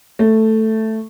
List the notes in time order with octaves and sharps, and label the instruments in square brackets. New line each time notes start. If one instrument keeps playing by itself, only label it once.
[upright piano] A3